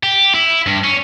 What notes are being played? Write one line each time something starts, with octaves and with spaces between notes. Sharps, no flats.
G4
E4
G2
C#4